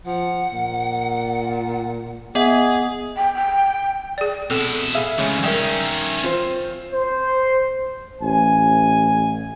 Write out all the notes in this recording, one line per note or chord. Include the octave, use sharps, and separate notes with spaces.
F3 F#5
A#2
B3 G#4 D#5 F#5
G5
G5
G#4 D5
B2 C4 E4 A4
G#4 E5 F5
C#3 E3 G#3 A3 C#4
D#3 G3 C#4 A#4 E5 G5
C4 F4 C5
C5
A1 G#5